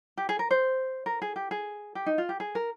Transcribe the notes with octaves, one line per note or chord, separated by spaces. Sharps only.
G4
G#4
A#4
C5
A#4
G#4
G4
G#4
G4
D#4
F4
G4
G#4
A#4